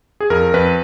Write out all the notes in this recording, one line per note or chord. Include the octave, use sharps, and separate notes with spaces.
G#4
F2 A#4
F2 B4